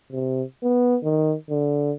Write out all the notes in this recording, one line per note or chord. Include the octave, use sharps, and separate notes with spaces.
C3
B3
D#3
D3